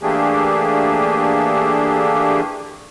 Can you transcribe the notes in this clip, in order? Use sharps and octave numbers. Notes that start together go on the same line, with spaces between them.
E3 A3 A#3 D4 G4 G#4